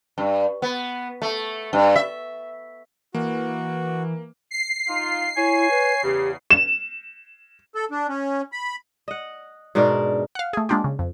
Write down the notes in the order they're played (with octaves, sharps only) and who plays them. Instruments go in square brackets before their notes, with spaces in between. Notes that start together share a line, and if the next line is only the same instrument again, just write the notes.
[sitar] G2
B3
A3
G2
E5
[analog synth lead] E3 [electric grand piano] A#3 [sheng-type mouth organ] F#4
[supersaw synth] C7
[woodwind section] D#4 F4
[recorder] E4 [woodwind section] C#5 G#5
[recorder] B4
[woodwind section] E2 C#3 [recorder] G4
[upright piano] E7
[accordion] A4
D4
C#4
B5
[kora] D#5 F#5
G#2 B2 D4 A#4
[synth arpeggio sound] F5 F#5
A3 G#4
G#3 A#3 D4 F4 G4
C#3
F2